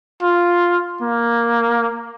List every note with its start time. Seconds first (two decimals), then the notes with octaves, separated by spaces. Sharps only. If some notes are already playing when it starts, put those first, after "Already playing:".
0.22 F4
1.02 A#3